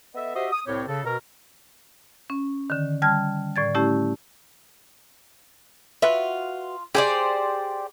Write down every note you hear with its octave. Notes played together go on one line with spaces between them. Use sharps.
B3 A4 D#5 E5
F#4 G4 C5 D#5 E5
D#6
C2 A2 C4 G4 C#5
C#3 A4
B2 A#4
C#4
D3 D#3
G3 A5 F6 G#6
A2 D5 G#6 A6
A3 C#4 E4 G4
F4 F#4 B4 E5
G4 G#4 C5 D5